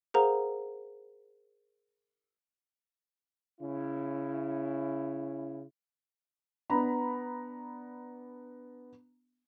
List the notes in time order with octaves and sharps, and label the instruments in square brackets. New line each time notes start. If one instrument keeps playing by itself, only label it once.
[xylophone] G#4 A#4 C5 F5 F#5 A#5
[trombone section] C#3 C#4 E4
[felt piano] B3 D4 A#5 B5